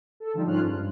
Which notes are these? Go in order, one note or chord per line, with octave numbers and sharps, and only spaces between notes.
A4
D3 F3 G3 D#4
G#2 F3 C#4 F4 F6 F#6
G2